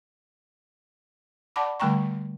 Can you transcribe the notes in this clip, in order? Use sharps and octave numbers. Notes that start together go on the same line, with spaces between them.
D5 F#5 A5 B5 D6
D3 G3 A3 G5 A#5 C#6